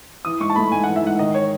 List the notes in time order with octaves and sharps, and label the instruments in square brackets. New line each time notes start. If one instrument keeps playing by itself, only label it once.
[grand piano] E3 [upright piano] D#6
[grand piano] G#2 [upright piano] C#6
[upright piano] A5
[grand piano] A3 [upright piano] B5
[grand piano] G#2 [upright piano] G#5
[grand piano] E3 [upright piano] F#5
[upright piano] E5
[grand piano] G#2 [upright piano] F#5
[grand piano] D#3 [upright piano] D#5
[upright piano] C#5